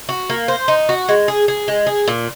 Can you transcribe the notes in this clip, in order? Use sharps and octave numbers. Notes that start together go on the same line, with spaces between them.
F#4
A#3
C5
D#4
F#4
G#3
G#4
G#4
G#3
G#4
A#2